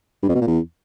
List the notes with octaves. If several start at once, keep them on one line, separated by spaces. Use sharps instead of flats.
G2
F2
B2
A#2
E2